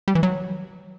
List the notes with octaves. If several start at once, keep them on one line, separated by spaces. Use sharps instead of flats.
G3
E3
F#3